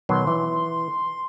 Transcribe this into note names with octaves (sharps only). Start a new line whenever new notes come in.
B2 D#3 F#3 C6
E3